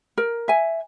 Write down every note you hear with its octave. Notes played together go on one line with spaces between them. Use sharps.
A#4
E5 G#5